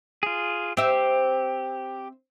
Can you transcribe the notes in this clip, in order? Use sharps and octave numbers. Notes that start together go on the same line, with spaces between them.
F4 G#4
C4 G4 E5